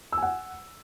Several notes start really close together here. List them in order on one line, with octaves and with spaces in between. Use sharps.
E6 G#5 F#5